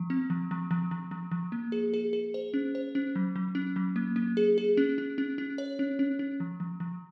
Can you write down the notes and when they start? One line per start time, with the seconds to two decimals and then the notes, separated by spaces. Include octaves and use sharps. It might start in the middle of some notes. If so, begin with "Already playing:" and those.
Already playing: F3
0.10 C4
0.30 F3
0.51 F3
0.71 F3
0.91 F3
1.11 F3
1.32 F3
1.52 A#3
1.72 G#4
1.94 G#4
2.13 G#4
2.34 C5
2.54 C#4
2.75 C5
2.95 C#4
3.16 F#3
3.36 F#3
3.55 C#4
3.76 F#3
3.96 A#3
4.16 A#3
4.37 G#4
4.58 G#4
4.77 C#4
4.98 C#4
5.18 C#4
5.38 C#4
5.58 C#5
5.79 C#4
5.99 C#4
6.19 C#4
6.40 F3
6.60 F3
6.80 F3